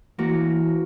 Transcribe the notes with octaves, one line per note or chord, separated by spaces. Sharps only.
E3 A#3 F#4